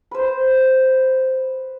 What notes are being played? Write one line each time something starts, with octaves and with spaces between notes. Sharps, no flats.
B4 C5